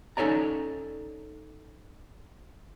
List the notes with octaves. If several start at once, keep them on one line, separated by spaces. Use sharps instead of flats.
C#4 D#4 A4 C#5 D5 A#5